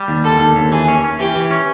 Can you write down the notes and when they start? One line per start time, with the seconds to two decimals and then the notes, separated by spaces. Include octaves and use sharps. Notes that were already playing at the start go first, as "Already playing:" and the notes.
Already playing: G3
0.08 D#2
0.24 D3 A4
0.40 D#2
0.56 D#2
0.72 E3 G#4
0.88 C#4
1.04 C#4
1.19 E3 G4
1.36 E3
1.51 C#4